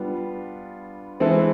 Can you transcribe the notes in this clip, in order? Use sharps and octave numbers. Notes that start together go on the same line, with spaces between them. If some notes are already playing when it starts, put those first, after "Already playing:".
Already playing: G3 B3 D4 F4
E3 G#3 C4 E4 A4